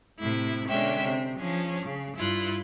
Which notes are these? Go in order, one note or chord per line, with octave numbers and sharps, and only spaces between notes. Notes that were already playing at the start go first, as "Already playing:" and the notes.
A2 C3 E4
B2 D3 G#3 C#4 E5 G5
C3
F3 C#4 D4 G#4
C#3
G2 E4 F4 F#6